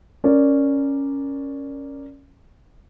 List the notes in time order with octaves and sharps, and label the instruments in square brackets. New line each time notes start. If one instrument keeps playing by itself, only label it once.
[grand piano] C#4 A#4 D5